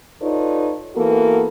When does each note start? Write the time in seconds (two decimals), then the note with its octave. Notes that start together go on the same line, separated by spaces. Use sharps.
0.22 D#4 F4 A4 B4 C#5 D5
0.96 E3 A#3 B3 F#4 A4 A#4